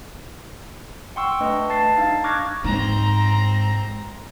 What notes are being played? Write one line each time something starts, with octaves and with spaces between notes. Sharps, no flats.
F#5 G5 C6 C#6 E6
A3 D4 B4 D#5
A5 A6 C7
D4 D#4 F5 A6 C7
C#6 D6 F6 F#6 G#6 A#6
G#2 C4 A#5